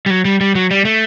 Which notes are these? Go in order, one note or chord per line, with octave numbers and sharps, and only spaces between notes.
G3
F#3
G3
G3
F#3
G3
A3